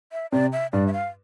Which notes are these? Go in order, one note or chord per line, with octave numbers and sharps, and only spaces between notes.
E5
C3 D5
E5
G2 D5
E5
F5